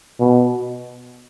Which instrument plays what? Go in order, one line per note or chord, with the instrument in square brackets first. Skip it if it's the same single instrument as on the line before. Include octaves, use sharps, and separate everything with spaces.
[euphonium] B2